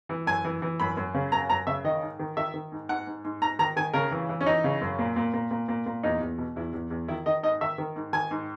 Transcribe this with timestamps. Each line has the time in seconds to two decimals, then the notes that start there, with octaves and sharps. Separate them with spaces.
0.09 E3
0.27 F#2 G#5
0.45 E3
0.62 E3
0.80 F#2 B5
0.97 F#2
1.14 C#3
1.32 F#2 A#5
1.49 F#2 A#5
1.67 C#3 E5
1.84 D#3 D#5
2.02 G#2
2.19 D#3
2.37 D#3 E5
2.54 D#3
2.72 G#2
2.89 G#2 F#5
3.07 G#2
3.24 G#2
3.41 G#2 A#5
3.59 D#3 A#5
3.76 D#3 G#5
3.93 C#3 A#4
4.11 E3
4.29 E3
4.41 C#4
4.46 E3 D#4
4.64 C#3
4.81 F#2
4.99 A#2
5.16 A#2
5.34 A#2
5.51 A#2
5.68 A#2
5.86 A#2
6.03 E2 D#4
6.21 E2
6.38 B2
6.56 E2 E4
6.73 E2
6.90 E2
7.08 D#3 E4
7.26 D#3 D#5
7.43 G#2 D#5
7.61 D#3 E5
7.78 D#3
7.96 G#2
8.13 D#3 G#5
8.31 G#2